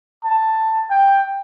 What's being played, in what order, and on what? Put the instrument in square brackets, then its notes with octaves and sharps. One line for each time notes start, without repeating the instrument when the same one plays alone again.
[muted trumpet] A5
G5